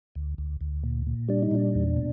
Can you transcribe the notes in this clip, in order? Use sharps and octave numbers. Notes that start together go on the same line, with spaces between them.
D2
D2
D2
A#2
A#2
G3 D4
D#4
A#2 D4
E2
B2